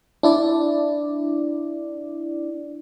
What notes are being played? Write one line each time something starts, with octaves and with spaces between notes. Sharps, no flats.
D4 E4 D5